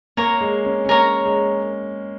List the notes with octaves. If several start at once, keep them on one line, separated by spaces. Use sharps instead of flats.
A#3 A#4 C#5 A#5
G#3
C#4
C#4
A#3 A#4 C#5 A#5
G#3